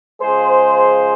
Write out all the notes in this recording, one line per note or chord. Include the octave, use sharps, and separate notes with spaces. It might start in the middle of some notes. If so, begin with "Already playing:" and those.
C#3 F3 G#3 G#4 C5